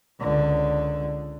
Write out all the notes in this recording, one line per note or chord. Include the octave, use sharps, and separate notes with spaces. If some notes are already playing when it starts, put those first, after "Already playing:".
C#2 D3